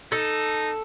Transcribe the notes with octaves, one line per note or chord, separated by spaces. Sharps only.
D#4 A4